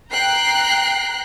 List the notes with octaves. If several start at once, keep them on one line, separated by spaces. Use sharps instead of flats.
G5 A#5 F#6 C7